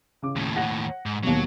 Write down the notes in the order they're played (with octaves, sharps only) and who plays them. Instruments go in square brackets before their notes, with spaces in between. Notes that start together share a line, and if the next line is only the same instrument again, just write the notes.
[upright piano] C#3 D6
[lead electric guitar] D#2 A2
[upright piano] F#5 A#6
[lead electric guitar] G#2
[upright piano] D#2 B2 [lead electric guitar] F#3